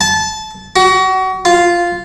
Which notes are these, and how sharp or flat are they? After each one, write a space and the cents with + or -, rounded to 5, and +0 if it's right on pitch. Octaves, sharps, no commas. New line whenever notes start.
A5 -20
F#4 +30
F4 -5